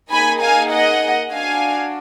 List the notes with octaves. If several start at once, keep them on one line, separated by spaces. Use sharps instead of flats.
A#3 D#4 G#4 G#5 B5
F5 G#5
D#5 F#5
D4 F#4 F5 G#5